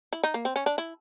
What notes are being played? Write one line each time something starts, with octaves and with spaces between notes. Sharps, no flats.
E4
D#4
A#3
C4
C#4
D4
E4